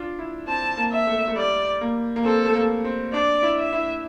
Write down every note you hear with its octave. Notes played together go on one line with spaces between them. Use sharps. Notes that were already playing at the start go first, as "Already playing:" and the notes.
Already playing: D4 F4
E4
C4 A5
A#3
E5
A3
A3
G3 D5
A#3
A#3
C4 A4
A3
A#3
C4
D4 D5
E4
E5
E4